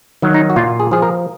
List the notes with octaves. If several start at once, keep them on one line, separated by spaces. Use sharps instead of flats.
D#3 F#3
D#4
F#4
A#2 F4
G#4
F3 G#4
A#4